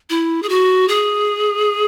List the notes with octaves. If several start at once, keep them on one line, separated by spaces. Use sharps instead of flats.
E4
G#4
F#4
G#4